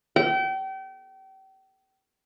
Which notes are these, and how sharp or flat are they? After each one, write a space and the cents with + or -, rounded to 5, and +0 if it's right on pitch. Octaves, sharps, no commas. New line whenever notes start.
G5 -35